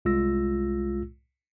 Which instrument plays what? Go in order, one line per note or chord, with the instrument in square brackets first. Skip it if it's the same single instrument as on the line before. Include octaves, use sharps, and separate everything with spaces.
[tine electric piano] C2 G#3 F4 E6 A#6